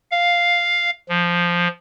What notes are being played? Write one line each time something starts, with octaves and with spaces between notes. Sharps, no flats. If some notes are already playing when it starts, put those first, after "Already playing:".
F5
F3